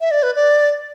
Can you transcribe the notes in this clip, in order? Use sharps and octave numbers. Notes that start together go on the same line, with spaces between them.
E5
D5
B4
D5